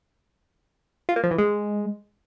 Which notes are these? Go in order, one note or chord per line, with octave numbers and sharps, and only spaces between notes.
F4
A#3
F3
E3
G#3